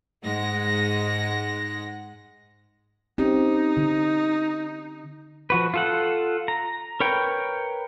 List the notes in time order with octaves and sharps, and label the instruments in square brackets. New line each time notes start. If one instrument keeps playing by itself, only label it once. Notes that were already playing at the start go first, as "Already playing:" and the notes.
[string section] G#2 G#3 F#5 A#6
[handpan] C4 C#4 G4 [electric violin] D#4
[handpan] D3
[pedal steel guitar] F3 F#4 B4
F4 A4 F#5
A#5
A#4 B4 C#5 G5